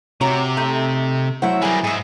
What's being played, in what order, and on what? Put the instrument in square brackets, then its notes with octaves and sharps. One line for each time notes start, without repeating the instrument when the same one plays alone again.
[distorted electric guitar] C3 [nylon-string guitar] F#4 C#5 F#5 [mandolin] A#5 D6
[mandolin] A3 D#4 G6 [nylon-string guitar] E5
[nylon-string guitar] F#3 E4 C5 [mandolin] F#4 E5
[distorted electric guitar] G3 A#3 [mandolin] G#4 B4
[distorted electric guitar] G#2 [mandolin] G#4 E5